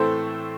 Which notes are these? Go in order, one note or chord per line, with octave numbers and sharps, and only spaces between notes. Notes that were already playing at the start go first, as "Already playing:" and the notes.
Already playing: A2 E3 A3 C4 A4 C5